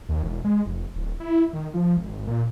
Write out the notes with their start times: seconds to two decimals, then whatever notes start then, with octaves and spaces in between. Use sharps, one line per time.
0.09 D#2
0.23 E1
0.45 G#3
0.66 F1
0.96 D1
1.20 E4
1.53 D#3
1.74 F3
1.97 G#1
2.27 A#2